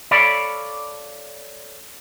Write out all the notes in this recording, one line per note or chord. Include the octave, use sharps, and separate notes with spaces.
A4 C#5 D5 F5 B5